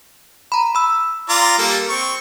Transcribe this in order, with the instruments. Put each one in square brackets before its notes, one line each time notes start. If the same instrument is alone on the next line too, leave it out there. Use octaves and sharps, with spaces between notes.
[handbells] A#5 B5
B5 E6
[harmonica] F4 D5 A#5
G3 A#3 A4
C4 C#6